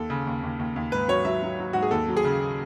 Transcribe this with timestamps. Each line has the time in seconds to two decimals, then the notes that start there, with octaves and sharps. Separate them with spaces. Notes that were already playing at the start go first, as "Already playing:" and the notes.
Already playing: D#2 A4
0.10 C#3
0.27 D#2
0.43 D#2
0.59 D#2
0.76 D#2
0.92 G#2 B4
1.08 F#3 C#5
1.25 F#3 E5
1.42 F#3
1.59 F#3
1.73 G#2 F#4
1.82 G#4
1.91 D#2 A4
2.08 F#3
2.17 G#4
2.24 C#3